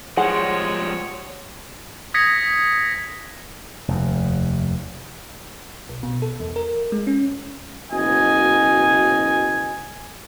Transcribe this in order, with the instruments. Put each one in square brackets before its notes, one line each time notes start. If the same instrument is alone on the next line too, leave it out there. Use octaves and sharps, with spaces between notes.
[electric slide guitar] F3 G3 G#3 [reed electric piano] G#4 C6 [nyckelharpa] C#5 [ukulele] F#5
[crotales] D#6 G#6 A#6 B6 C#7
[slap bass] F1 D#2
[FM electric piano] B1
B2
A4
E2
A#4
G#3
C#4
[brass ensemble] F#1 B2 D#5 G#5